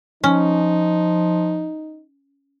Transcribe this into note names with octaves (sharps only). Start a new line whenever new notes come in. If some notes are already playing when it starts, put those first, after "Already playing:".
F3 C#4 D#4